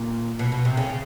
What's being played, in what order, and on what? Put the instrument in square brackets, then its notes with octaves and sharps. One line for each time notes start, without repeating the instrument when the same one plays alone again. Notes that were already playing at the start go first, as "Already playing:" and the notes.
Already playing: [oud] A#2
B2
B2
C3
C#3
C#3